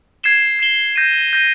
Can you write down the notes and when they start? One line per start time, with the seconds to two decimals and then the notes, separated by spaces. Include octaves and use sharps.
0.23 G#6 C7 E7 G7
0.59 G#6 C7 E7 G7
0.96 G6 A#6 D#7
1.33 G6 A#6 D#7